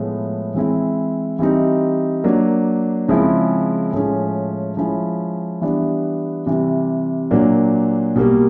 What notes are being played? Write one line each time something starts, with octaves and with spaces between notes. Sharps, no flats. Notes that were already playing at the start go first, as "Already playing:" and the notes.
Already playing: A2 F3 G#3 B3
E3 G#3 C4 E4
E3 G3 C4 D#4
F#3 A#3 D4
C#3 F3 G#3 C4 E4
A2 F3 G#3 C#4
F3 G#3 C#4 E4
E3 G3 B3 D4
C3 E3 G3
A#2 F#3 A#3 D4
B2 G3 A#3